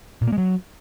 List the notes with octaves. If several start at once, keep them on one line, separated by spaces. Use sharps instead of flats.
A#2
A#3
G#3
F#3